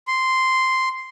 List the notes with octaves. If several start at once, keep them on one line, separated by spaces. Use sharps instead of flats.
C6